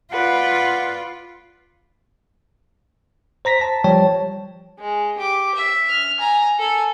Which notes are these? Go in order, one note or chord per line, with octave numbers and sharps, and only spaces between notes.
F4 B4 D5 F#5
C5 A#5 A#6 B6
A5
F3 G3 C#5 G5 A5
G#3
G4 D6
E5
F6
G#5 A#5
A4 G#5